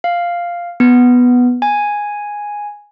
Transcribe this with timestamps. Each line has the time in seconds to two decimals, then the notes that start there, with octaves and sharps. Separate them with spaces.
0.04 F5
0.80 B3
1.62 G#5